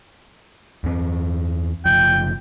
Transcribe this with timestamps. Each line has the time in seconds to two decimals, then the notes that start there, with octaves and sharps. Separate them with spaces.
0.84 E2 C4
1.85 F#1 F3 G5